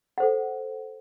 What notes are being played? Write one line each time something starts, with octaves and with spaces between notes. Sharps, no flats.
A4 C5 F#5